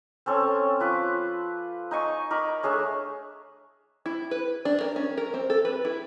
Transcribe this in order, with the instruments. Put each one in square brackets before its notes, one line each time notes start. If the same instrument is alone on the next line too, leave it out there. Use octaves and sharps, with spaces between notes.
[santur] C4 C#4 A4 C#5
F3 B4 D6
D#4 G#5 C#6
D#4 A#4 B5 D6
A3 D4 G#4 C#5
[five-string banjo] E4
B4
D4
A#4
C#4
A#4
C4
A4
B4
E4